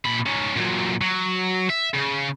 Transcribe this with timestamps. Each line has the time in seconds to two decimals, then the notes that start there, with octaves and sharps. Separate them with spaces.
0.06 A#2 B5
0.26 C#4 D#4
0.56 A#2 F#3
1.01 F#3
1.70 E5
1.94 C#3